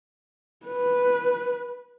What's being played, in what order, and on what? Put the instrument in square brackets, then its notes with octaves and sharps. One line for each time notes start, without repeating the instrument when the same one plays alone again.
[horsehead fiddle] B4